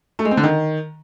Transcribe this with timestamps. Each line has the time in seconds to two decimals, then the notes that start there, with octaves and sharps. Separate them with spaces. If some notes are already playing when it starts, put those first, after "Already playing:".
0.19 A3
0.25 G#3
0.31 C4
0.37 D3
0.43 D#3